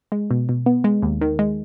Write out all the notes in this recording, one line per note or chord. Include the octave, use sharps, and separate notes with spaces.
G#3
B2
B2
B3
G#3
D#2
D#3
G#3